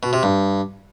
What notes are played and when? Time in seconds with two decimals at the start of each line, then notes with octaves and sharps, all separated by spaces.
0.03 B2
0.13 C3
0.23 G2